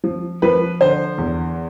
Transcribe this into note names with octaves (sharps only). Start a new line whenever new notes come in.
F3
F3 B4
D3 C5
E2